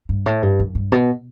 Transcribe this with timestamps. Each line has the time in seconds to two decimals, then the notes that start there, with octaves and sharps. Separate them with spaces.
0.09 G2
0.26 A2
0.43 G2
0.59 F#2
0.75 G2
0.92 B2